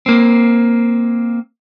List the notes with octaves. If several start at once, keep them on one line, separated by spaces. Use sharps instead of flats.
A#3 C4